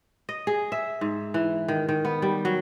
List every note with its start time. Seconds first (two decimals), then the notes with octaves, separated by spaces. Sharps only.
0.29 D#5
0.47 G#4
0.72 E5
1.01 G#2
1.34 E3
1.68 D#3
1.89 D#3
2.05 B3
2.22 G3
2.45 F#3